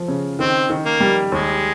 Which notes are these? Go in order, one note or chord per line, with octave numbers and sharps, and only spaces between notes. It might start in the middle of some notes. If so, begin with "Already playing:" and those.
Already playing: F3
C#3
D#3 C4
D#3
A#3
G3
D#2 G#3